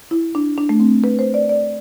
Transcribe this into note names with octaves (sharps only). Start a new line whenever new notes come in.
E4
D4
D4
A3
C4
B4
C5
D5
D5